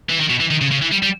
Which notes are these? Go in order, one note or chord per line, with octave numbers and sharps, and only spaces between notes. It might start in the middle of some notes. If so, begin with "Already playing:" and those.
E3
D#3
B2
E3
D#3
C#3
C#3
E3
G3
G3